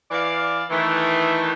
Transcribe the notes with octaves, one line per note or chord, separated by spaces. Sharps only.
E3 D5 F5
D#3 E3 A3